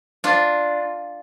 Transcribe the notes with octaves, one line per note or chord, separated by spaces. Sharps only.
D4 F4